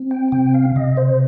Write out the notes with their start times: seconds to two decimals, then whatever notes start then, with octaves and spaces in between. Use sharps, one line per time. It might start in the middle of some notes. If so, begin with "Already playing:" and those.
Already playing: C4
0.11 G5
0.32 C3 G5
0.54 F5
0.76 C3 D#5
0.97 C5